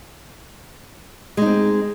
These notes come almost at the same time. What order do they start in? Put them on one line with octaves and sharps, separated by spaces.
G#3 D#4 C4